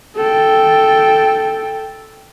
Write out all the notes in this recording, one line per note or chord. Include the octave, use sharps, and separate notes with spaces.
A4 G5